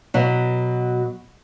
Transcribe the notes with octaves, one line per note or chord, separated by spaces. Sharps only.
B2 F#3